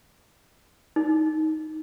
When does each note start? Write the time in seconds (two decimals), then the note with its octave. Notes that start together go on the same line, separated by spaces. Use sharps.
0.96 D#4